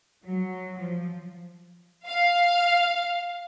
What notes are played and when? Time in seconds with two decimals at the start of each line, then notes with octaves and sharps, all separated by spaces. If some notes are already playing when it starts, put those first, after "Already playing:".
0.24 F#3
0.79 F3
2.07 F5